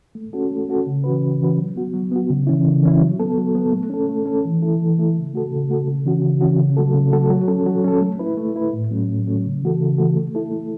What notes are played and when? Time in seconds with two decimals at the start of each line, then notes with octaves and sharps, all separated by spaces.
0.15 A3
0.33 C#4 F#4 A4
0.51 A3
0.69 C#4 F#4 A4
0.87 C#3
1.04 E3 C#4 F#4 B4
1.22 C#3
1.41 E3 C#4 F#4 B4
1.57 F#3
1.76 B3 F#4
1.94 F#3
2.11 B3 F#4
2.30 C#3
2.47 E3 C#4 E4
2.65 C#3
2.83 E3 C#4 E4
3.01 F#3
3.19 B3 A4
3.37 F#3
3.55 B3 A4
3.72 A3
3.90 C#4 A4
4.09 A3
4.26 C#4 A4
4.45 E3
4.62 A3 E4 A4
4.80 E3
4.98 A3 E4 A4
5.15 C#3
5.34 A3 F#4 A4
5.52 C#3
5.70 A3 F#4 A4
5.87 C#3
6.05 E3 C#4 F#4
6.22 C#3
6.41 E3 C#4 F#4
6.58 C#3
6.77 F#3 A3 F#4 A4
6.94 C#3
7.12 F#3 A3 F#4 A4
7.30 F#3
7.48 C#4 A4
7.66 F#3
7.84 C#4 A4
8.01 A3
8.19 E4 B4
8.37 A3
8.56 E4 B4
8.73 A2
8.91 F#3 A3 C#4
9.09 A2
9.27 F#3 A3 C#4
9.45 C#3
9.62 E3 A3 F#4 A4
9.81 C#3
9.98 E3 A3 F#4 A4
10.16 A3
10.35 E4 A4
10.52 A3